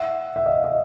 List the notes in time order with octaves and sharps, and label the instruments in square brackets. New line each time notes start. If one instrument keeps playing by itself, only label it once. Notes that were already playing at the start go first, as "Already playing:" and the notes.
Already playing: [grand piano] E5 F#5
E5
D#5 F5
D#5